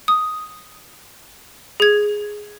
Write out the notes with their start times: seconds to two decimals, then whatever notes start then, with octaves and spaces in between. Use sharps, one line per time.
0.08 D#6
1.80 G#4 G#6